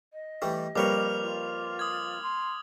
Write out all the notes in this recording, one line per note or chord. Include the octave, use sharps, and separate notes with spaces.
D#5
E3 G3 A3 G4
F2 G3 A#3 B4 C#5 D6 F6 F7
F4
D#6 G#6
C6